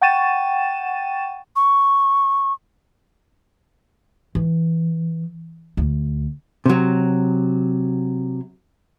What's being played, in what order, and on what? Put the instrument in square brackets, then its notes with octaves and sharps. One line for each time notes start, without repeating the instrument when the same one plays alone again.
[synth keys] F#5 G5 C#6 A6 D#7 E7
[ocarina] C#6
[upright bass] E3
D2
[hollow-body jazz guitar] C3 F#3